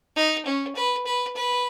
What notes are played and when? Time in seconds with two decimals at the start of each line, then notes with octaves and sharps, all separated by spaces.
0.16 D#4
0.46 C#4
0.76 B4
1.06 B4
1.36 B4